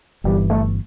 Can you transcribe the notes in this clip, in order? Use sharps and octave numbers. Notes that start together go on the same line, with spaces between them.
G1 G2 E3 G3
A3